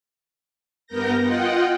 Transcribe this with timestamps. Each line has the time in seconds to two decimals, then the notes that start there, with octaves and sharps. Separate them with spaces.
0.87 G2 B3 A#4 G6 A#6
1.21 F4 D#5 F#5 G5